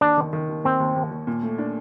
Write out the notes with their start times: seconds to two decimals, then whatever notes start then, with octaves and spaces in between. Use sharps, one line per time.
0.01 D#2 D4
0.17 D#3
0.33 D#3
0.49 D#2
0.64 D#2 C4
0.80 D#2
0.96 D#2
1.11 D#2
1.27 A#2
1.43 A3
1.58 D4